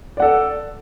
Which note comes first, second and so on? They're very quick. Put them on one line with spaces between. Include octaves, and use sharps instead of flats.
D5 F#5 A4